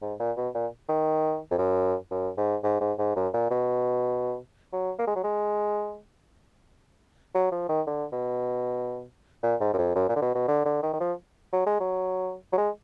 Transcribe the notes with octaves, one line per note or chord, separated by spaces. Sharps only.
G#2
A#2
B2
A#2
D#3
F2
F#2
F#2
G#2
G#2
G#2
G#2
F#2
A#2
B2
F#3
A#3
G#3
F#3
G#3
F#3
F3
D#3
D3
B2
A#2
G#2
F#2
F2
F#2
A#2
D3
B2
B2
D3
D3
D#3
D#3
F3
F#3
G#3
F#3
F#3
G#3